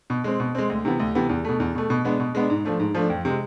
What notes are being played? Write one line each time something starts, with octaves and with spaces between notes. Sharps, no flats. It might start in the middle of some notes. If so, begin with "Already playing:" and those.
B2
G#3 C4
B2
G#3 C4
D2
C3 E3 B3
D2
C3 E3 B3
E2
B2 A3
E2
B2 A3
B2
G#3 B3 D4
B2
G#3 B3 D4
G#2
F3 A3 D4
G#2
F3 A3 D4
F2
C3 G#3